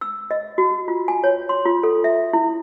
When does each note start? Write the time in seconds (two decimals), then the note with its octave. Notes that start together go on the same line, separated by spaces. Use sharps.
0.01 E6
0.31 D#5
0.58 F#4
0.88 F4
1.08 G#5
1.24 C#5
1.49 C6
1.65 F4
1.83 A4
2.04 E5
2.33 E4